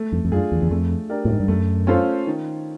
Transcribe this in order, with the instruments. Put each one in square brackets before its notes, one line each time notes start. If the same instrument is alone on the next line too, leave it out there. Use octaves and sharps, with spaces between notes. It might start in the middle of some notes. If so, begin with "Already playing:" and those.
Already playing: [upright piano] A3
[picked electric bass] F2
F2
[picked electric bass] F#2 [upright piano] D4 F4 G#4
[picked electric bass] E2
E2
[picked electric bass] F2 [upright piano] A3
[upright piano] D4 G4 A#4 D5
[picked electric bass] A2
G#2
G2
[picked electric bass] F#2 [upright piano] A3
[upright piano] C#4 F4 A4 C5
D#3